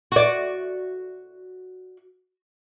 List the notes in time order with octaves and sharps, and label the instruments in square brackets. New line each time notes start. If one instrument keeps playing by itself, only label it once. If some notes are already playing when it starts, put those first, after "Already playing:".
[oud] F#4 D5